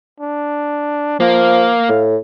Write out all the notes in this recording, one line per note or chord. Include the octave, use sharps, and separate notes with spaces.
D4
F3 A#3 F5
A2